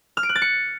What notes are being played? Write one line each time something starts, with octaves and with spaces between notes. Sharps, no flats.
F6
D7
F#6
A6
C#7